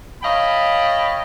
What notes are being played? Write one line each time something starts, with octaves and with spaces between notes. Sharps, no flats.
C#5 D#5 F5 G5 A5 B5